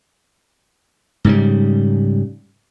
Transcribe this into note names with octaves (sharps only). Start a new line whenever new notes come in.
G#2 C#3 G3